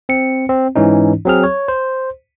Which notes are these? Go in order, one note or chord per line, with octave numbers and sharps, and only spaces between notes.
C4 C#7
C4
G#2 E3 C#4 D#4
F#3 C4 G#4 F6
C#5
C5